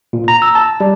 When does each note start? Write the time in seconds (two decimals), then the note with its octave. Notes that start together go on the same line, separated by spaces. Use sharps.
0.13 A#2
0.28 A#5
0.42 E6
0.55 A5
0.80 G3